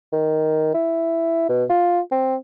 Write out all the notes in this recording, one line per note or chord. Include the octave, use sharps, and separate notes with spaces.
D#3
E4
B2
F4
C4